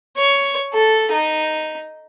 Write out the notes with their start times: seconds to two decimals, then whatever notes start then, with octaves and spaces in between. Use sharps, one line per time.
0.17 C#5
0.74 A4
1.12 D#4